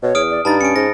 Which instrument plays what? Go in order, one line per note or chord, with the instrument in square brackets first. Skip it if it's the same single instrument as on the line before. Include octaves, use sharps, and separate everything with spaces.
[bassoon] B2 [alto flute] C#5
[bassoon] E2 [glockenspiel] D#6 F6 D7
[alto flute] D5
[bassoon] G2 [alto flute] D#4 [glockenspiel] A5 B5 A6
[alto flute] C#4 [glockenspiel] C#7 D7
[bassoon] G#2 [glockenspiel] A#6